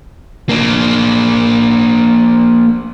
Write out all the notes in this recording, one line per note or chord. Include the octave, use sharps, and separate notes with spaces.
A#3 D4